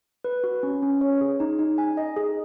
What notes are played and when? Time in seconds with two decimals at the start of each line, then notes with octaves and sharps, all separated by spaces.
0.24 B4
0.44 F#4
0.63 C#4
0.82 C#4
1.01 C#5
1.21 G#4
1.40 D#4
1.59 D#4
1.78 G#5
1.97 D#5
2.16 G#4